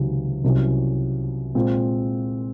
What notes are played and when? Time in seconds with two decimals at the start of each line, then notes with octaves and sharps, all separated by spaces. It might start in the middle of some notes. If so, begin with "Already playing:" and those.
Already playing: C#2 C3 D#3 F#3
0.44 C2 C3 F#3 C#4 F#4
1.55 A#2 G#3 C4